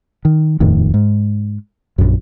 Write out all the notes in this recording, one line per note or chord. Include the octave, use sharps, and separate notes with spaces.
D#3
D#1 F2 A2 D#3
G#2
A#1 F#2